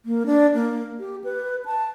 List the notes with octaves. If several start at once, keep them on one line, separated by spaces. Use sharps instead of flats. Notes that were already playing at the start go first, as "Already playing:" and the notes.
A#3
D4
A#3
G4
B4
A5